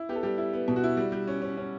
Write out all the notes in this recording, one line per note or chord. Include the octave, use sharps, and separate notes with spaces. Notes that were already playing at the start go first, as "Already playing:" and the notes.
Already playing: E4
B3 G4
A4
G3 G4
E4
B3
B2
F#4
E4
G3
G3
C#4
C#4
C#4